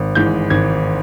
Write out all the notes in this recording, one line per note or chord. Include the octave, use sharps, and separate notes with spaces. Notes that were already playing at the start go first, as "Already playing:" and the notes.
Already playing: G#1
G#2 E3 G6
G#1 G#6